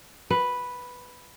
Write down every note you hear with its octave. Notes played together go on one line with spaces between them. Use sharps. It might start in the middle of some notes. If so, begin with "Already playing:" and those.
B4